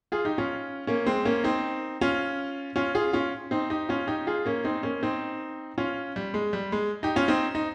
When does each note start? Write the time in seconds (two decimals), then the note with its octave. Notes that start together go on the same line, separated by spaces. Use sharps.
0.12 F4 G#4
0.25 D#4 G4
0.38 C#4 F4
0.87 A#3 C#4
1.06 G#3 C4
1.25 A#3 C#4
1.44 C4 D#4
2.01 C#4 F4
2.76 C#4 F4
2.95 F4 G#4
3.13 C#4 F4
3.51 C4 D#4
3.70 D#4 G4
3.89 C#4 F4
4.08 D#4 G4
4.27 F4 G#4
4.46 A#3 C#4
4.64 C4 D#4
4.83 A#3 C#4
5.03 C4 D#4
5.78 C#4 F4
6.16 G3
6.34 G#3
6.53 G3
6.72 G#3
7.03 D#4 G4
7.16 C#4 F4
7.28 C4 D#4
7.55 D#4